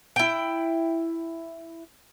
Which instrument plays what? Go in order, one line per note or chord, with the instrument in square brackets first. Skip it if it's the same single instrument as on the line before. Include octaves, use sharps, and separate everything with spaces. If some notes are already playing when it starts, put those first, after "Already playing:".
[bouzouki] E4 G5